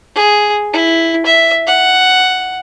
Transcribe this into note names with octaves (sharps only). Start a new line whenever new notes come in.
G#4
E4
E5
F#5